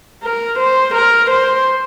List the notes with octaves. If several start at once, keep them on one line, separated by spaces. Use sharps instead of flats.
A#4
C5
A#4
C5